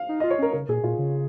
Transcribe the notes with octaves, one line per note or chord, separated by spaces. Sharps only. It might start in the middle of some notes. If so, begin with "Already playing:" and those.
Already playing: F5
D#4
D#5
F4
C#5
C#4 A#4
C#3 A#4
A#2 G#4
A#2 F4
C#3